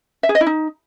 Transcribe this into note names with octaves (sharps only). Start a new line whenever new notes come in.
E5
G#4
D#5
E4
D#4